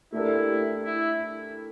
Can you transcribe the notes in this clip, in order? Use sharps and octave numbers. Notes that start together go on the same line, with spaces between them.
A3 D4 E4 G4 A#4
E4